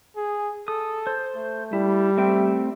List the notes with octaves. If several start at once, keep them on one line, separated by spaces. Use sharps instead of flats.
G#4
A4 D#6
C5
A3
G3 E4
A3 C4 E5 G5